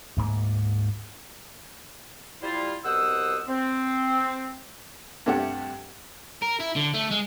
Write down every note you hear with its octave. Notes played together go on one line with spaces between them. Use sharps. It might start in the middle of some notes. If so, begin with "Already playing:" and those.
D2 G#2 A#3
G3 E4 F4 C5
C2 B2 C5 F#5 D#6 E6
C4
G2 C3 A3 D4 G4 F#5
A#4
E4
D3
A3
G#3